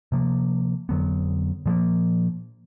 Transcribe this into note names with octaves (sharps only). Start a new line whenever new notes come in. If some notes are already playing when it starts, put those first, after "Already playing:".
C3 F3 A#3
F2 D3 F#3 B3
A#2 F3 A#3